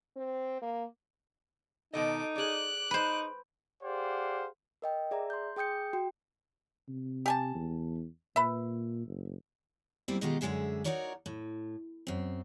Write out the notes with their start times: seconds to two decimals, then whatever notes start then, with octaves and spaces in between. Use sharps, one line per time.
0.16 C4
0.62 A#3
1.93 B2 D#3 D#4 A4 D#5 D6
2.36 G#4 D5 D6 F#6
2.91 D#4 B4 C5
3.83 G4 G#4 C5 D5 F5 F#5
4.82 A#4 D#5 G5
5.11 G#4 D5 E5 A#5
5.30 C6 G6
5.56 G#4 G5 D#6 G6 C#7
5.93 F#4 G5
6.88 C3
7.26 G4 G#5 A5
7.55 E2
8.36 A#2 B4 E5
9.06 F#1
10.08 B2 F#3 G3 A#3 C4 E4
10.21 B2 D#3 G#3 D#4 F4 G4
10.41 F#2 D3 D#3 G#3 G#4 E5
10.84 D#4 F4 F#4 A#4 C#5 D5
11.26 A2
12.07 F#2 C4